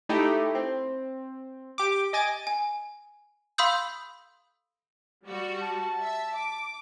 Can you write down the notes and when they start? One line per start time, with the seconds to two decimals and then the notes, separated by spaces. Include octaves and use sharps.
0.09 A3 D#4 E4 G4
0.55 C4
1.78 G4 D6
2.13 D#5 G#5 A6 D7
2.47 G#5
3.58 F5 B5 C6 D#6 E6 G6
5.26 G3 F#4
5.62 A5
6.02 E5
6.35 D6